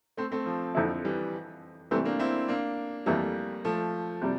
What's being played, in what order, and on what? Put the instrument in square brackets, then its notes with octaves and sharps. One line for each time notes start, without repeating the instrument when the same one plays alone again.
[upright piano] A3 C4
A3 C4
F3
[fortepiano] F2 D3 F3 C4 E4
[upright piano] E3 G3
[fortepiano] C3 E3 G3 [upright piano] A3 C4
[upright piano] A#3 D4
C4 E4
A#3 D4
[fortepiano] F2 E3 A3 [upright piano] G3 A#3
[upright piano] F3 A3
[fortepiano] C3 G3